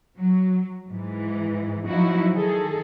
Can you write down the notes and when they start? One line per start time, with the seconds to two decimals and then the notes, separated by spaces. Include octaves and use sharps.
0.21 F#3
0.90 G#2 E3
1.87 F3 F#3 D#4 E4 F#4
2.34 D#3 G#4 A4